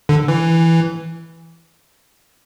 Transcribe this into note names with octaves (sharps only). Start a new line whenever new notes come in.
D3
E3